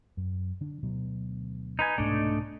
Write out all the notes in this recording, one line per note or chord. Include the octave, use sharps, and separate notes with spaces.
F#2
D3 D4
D2 B2 F#3
D#4 B4 G#5
C2 G#2 B2 A3 D4 D#4